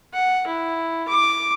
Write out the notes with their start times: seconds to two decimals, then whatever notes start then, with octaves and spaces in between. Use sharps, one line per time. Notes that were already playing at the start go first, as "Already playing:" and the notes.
0.14 F#5
0.47 E4
1.08 D6